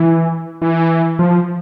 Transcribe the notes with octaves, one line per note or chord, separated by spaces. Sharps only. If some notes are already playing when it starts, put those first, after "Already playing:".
Already playing: E3
E3
F3